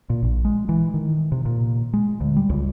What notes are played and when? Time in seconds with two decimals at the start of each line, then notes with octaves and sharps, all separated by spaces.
0.10 A#2
0.22 A#1
0.45 G#3
0.69 E3
0.94 D#3
1.32 C3
1.45 A#2
1.93 G#3
2.21 D2
2.36 G3
2.49 C#2